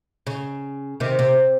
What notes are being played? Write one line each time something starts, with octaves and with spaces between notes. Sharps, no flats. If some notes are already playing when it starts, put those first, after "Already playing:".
C#3
C3 D#3
C3